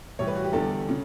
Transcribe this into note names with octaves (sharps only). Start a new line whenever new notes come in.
A2 E3 G3 C#5
B4
F#4
G4
E2 D3 G3 A4
C#3